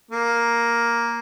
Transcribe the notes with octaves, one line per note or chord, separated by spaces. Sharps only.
A#3